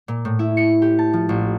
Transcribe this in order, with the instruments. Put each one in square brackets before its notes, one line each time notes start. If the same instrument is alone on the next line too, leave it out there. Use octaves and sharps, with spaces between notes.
[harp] A#2
A2
E4
C#7
G4
A5
F3
A1